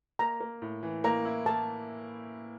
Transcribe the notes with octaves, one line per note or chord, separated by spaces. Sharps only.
A#3 A#5
A#3
A2
E3
A#3 A#5
E4
A#3 A5